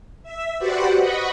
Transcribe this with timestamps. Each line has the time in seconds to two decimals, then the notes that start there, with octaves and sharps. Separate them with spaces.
0.23 E5
0.58 F#4 G4 B4 C5 D5 F#5
0.97 D#5 F#5 B5 C#6